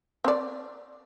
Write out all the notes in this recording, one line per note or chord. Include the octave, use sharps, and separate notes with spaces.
C4 D5